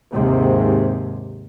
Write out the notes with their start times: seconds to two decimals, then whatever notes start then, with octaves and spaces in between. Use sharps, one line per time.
0.13 D#2 G#2 C3